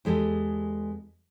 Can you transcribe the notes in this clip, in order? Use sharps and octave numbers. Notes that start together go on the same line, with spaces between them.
E2 G#3 G4 A4 D#5